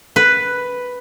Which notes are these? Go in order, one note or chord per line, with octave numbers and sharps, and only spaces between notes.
B4